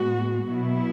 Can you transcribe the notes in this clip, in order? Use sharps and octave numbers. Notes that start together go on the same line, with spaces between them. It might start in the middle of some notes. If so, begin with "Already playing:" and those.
Already playing: A2 G#3 B3 F#4
B2 F#3 B3 E4